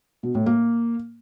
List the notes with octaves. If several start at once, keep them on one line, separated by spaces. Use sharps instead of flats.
B2
A2
A#3